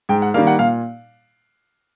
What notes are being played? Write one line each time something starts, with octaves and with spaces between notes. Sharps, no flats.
G#2 G5
F#5
D#3 G3 A#3 F5
F#5
A#2 F5